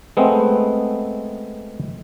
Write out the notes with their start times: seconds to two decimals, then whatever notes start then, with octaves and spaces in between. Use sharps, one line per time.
0.17 G#3 A3 B3 C4